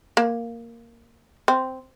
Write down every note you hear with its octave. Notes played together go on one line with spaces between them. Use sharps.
A#3
C4